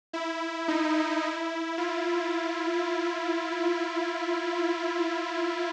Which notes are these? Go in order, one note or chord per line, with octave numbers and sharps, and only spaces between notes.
E4
D#4
E4
F4